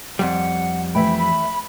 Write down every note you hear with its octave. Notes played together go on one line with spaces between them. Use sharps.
F2 G3 F#5
E3 A3 E5 G5 B5
B5